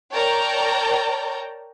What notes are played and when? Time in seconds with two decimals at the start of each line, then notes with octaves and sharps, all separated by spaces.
0.13 A#4 C#5 D5 G5 A5 A#5